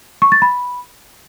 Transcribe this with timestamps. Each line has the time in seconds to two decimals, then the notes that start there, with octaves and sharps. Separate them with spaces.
0.22 C#6
0.32 A6
0.42 B5